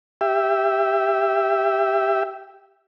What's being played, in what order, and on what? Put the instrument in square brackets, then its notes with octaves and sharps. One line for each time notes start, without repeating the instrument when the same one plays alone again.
[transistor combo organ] G4 E5